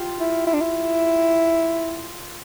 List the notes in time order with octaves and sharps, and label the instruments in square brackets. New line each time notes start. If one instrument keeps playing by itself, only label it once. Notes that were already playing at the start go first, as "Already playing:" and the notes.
Already playing: [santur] F4 G4
[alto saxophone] E4
E4
D4
E4